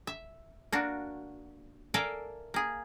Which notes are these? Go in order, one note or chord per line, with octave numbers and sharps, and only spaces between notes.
E5
A#3 D4 F#4
A4 A#4 D5 E5 F5 G#5
A#3 G#4